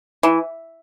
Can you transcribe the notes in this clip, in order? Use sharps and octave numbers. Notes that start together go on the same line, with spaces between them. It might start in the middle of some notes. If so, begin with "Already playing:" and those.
E3